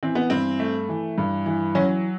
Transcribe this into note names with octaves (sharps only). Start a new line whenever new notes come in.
E3 C4
B3
G2 C4
A3
E3
G2
E3
F#3 C#4